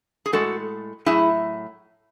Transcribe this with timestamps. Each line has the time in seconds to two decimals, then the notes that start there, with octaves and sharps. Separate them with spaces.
0.26 G#4
0.33 A2 G#3 F#4 A4
1.06 A2 F#3 E4 G#4